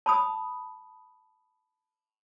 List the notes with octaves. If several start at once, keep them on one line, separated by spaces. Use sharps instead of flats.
A5 B5 D#6